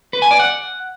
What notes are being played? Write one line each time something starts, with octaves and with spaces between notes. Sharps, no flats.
B4
G#5
D5
F#5